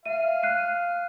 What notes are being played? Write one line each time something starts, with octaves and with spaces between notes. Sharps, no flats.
E5 F5 D#7
F#6 C7 D#7